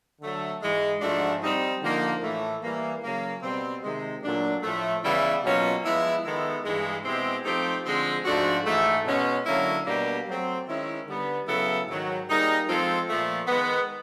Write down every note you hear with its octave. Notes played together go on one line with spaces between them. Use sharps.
D3 F#3 A3
G#2 E3 G#3
G#2 F3 A3 D4 F#4
G3 C4 D#4
D3 F3 A#3 D#4
A2 E3 A3
E3 G3 A#3
C#3 F#3 A#3
B2 G3 C4
C3 D#3 G#3
A#2 F#3 A3 D4
A2 F3 A3
C#3 E3 G3 B3 E4
B2 F#3 A#3 C#4 F4
F3 G#3 B3 E4
D#3 G#3 B3 E4 A4
G2 E3 G#3
B2 G#3 C4 E4 G4
F3 A3 C4 D#4 G4
D3 F3 G#3 C4
G#2 F3 A3 D4 F#4
G#2 E3 A3
B2 G#3 C#4
D3 F#3 A#3 C#4 E4
B2 G3 A#3 D4 G4
F#3 A3 C4
D#3 G#3 C#4 E4
D3 G3 B3
C#3 F#3 B3 E4 A4
G#2 D#3 F#3
G3 A#3 D#4 G#4
F3 G#3 C4 F4 A4
A#2 F3 A3
D#3 G#3 B3